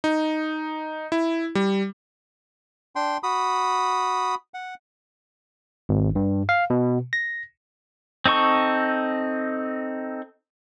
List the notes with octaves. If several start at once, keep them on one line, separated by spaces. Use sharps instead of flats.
D#4
E4
G3
D4 G5 C6
F#4 B5 D#6
F#5
G#1
G2
F5
B2
A#6
C4 D#4 A4 C#6